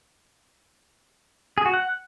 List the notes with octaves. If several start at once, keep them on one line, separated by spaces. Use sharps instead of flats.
G#4
F#4
F#5